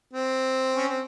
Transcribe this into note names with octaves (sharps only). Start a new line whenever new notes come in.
C4
C#4
C4